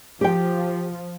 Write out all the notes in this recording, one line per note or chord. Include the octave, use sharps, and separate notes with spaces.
F3 G4 G5